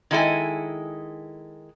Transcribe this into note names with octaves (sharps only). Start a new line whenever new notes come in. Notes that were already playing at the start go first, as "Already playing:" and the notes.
D#3 G#3 E4 A4 G#5